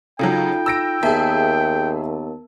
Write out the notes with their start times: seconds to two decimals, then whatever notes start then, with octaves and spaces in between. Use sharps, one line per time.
0.19 C#3 F#3 D#4 F4 A4 G5
0.66 E6 A#6 D7
1.03 D#2 B3 G#4 A#4 E5 A5